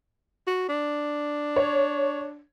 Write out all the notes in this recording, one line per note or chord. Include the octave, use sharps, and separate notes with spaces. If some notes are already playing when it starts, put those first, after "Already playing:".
F#4
D4
C#5